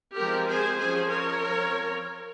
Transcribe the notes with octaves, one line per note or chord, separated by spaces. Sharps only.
F3 G#3 C4 G4 A#4
G#4 C5
F3 G#3 C#4 G#4 C5
A#4 C#5
F3 C4